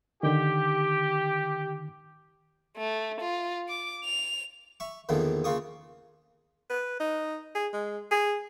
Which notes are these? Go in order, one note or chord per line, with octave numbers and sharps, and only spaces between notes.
D3 D#3 G4
A3
F4
D6
F7
E5 C#6
E2 A#2 D3 D#3 F3
C#3 A#3 F4 C#6 D#6
B4
D#4
G#4
G#3
G#4